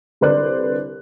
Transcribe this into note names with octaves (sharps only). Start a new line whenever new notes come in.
C2 D3 B4 C5 D5 F#6